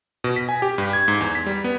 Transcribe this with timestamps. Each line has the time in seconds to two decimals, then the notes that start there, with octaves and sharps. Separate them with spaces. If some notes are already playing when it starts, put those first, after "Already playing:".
0.24 B2
0.36 B6
0.49 G#5
0.62 G4
0.78 G2
0.93 G#6
1.08 G#2
1.21 E2
1.35 B6
1.47 G3
1.64 B3